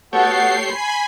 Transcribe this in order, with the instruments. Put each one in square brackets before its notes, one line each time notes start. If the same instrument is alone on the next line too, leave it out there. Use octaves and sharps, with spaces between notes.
[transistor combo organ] A3 G4 C#5 [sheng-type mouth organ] B3 F#4 A4 [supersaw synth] C7
[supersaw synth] G#5 B5 [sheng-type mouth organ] C6